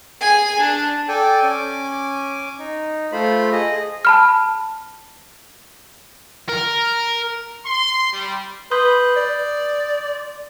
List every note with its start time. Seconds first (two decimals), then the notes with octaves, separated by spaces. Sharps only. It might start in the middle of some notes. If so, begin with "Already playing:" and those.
0.21 G#4 G#5
0.59 D4
1.08 A4 D5 G5 G#5
1.42 C#4 G#5 D6
2.59 D#4
3.12 A3 F4 C5 B5
3.52 G#4 D#5
4.05 A5 B5 F6
6.49 A#4
7.66 C6
8.12 G3
8.71 B4 C6 D#6 G6
9.16 D5